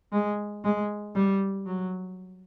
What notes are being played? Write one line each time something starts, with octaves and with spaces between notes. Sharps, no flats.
G#3
G#3
G3
F#3